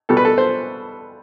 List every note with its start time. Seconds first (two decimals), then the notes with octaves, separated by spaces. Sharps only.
0.09 B2 G3 A4
0.17 B4
0.25 A4
0.38 C5